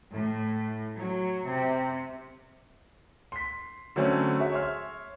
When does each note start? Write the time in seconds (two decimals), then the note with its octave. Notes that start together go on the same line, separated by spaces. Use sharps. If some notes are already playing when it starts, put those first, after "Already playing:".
0.12 A2
0.95 F#3
1.46 C3
3.32 C6 B6
3.96 D3 F#3 A3 C4 C#4
4.39 F#4 G#4 E5
4.52 C#5 E5 C6 F6